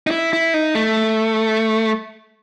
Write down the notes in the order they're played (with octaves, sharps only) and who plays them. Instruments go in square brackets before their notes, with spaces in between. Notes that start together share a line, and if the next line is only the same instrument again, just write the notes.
[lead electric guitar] D#4
E4
E4
D#4
A3